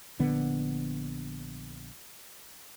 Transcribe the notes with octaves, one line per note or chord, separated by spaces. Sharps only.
A#1 D3 B3